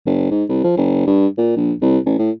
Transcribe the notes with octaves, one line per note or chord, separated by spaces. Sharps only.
F#1
G#2
C2
F3
F#1
G2
A#2
A#1
C2
A1
A2